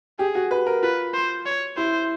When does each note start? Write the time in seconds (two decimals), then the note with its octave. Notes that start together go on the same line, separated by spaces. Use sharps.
0.19 G4 G#4
0.35 F#4
0.51 B4
0.66 A#4
0.82 F4 B4
1.14 C5
1.46 C#5
1.77 E4 C5